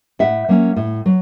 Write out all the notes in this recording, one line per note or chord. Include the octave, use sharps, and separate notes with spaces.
A2 E5 F#5
F#3 A#3 C#4
A2
F#3